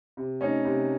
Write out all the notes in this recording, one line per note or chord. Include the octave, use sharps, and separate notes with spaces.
C3
A3 C#4 D#4
C3